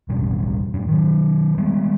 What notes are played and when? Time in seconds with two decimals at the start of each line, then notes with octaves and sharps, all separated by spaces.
0.09 E1 A1 G2 B2
0.74 F#2 A2
0.88 D#3 F#3
1.58 G3 G#3 B3